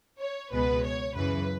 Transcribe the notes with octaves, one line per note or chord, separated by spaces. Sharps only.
C#5
C#2 B2 G#3 B3 B4
C#5
F#2 C#3 E3 B4